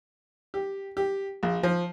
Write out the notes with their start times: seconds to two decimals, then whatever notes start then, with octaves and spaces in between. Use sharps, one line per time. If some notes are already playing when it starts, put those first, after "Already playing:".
0.54 G4
0.97 G4
1.43 A#1
1.63 F3